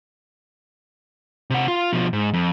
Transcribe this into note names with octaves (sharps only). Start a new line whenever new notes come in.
C3 F#5
F4
B2 F3
G#2
F2